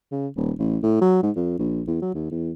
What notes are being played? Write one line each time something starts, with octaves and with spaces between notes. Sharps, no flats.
C#3
D#1
A1
A2
F#3
G#2
F2
A#1
E2
F#3
D#2
E2